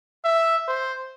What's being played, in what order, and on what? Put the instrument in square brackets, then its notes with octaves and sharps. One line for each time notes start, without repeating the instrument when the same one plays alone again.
[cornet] E5
C5